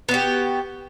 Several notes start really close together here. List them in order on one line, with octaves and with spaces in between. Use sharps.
B3 F#4 G4